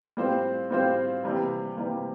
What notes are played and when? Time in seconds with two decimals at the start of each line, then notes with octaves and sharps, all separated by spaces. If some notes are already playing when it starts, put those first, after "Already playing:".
0.17 A2 G3 C4 F4 C5
0.70 A2 G3 C4 F4 C5
1.23 C3 E3 G3 A#3
1.77 C3 E3 G3 A#3